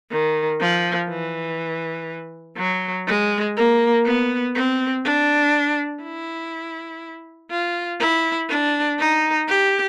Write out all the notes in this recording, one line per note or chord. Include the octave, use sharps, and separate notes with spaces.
D#3
F3
E3
F#3
G#3
A#3
B3
C4
D4
E4
F4
E4
D4
D#4
G4